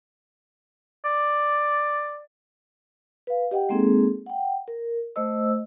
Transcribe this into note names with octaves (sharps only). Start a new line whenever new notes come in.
D5
B4 F5
G4 D#5 F#5 G5
G#3 A#3 C4 D#4 G#4 A4
F#5 G5
A#4
A3 C5 D#5 E6